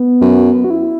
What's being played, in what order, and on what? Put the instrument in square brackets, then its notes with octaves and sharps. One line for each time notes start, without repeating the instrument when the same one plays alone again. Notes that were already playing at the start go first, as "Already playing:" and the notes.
Already playing: [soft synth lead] B3
[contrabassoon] F#2
[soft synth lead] F#4
E4